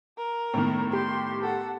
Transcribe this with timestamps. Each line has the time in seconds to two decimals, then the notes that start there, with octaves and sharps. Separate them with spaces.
0.18 A#4
0.54 A2 D#3 B3
0.93 G4 C6
1.41 A4 F#5